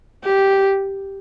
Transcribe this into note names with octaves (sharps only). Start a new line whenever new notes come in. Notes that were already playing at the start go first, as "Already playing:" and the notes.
G4